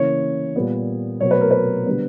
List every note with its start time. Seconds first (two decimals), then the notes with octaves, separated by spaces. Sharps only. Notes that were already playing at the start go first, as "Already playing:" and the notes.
Already playing: C#3 E3 A#3 C#5
0.56 A#2 G3 B3
1.20 B2 F#3 B3 C#5
1.31 B4
1.41 A#4
1.51 B4
1.86 D3 G3 B3